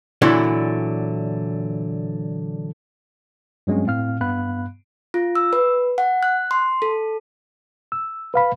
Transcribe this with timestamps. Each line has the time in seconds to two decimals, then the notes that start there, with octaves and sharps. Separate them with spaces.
0.22 A#2 D3 E3 F#3 D4 E4
3.67 G2 F#3 G#3 C4 C#4
3.86 A2 C4 F5 F6
4.21 G2 B3 F5 B5 F#6
5.14 F4
5.35 E6
5.53 B4
5.98 F#5
6.23 F#6
6.51 C6
6.82 A4
7.92 E6
8.34 B4 F5 B5